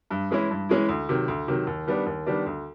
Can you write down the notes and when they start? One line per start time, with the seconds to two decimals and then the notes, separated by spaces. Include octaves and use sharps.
0.11 G2
0.31 E3 G#3 C#4 E4
0.51 G2
0.69 E3 G#3 C#4 E4
0.89 D2
1.09 C3 D#3 F#3
1.28 D2
1.48 C3 D#3 F#3
1.67 D#2
1.87 D#3 G3 B3 D4
2.06 D#2
2.26 D#3 G3 B3 D4
2.46 D2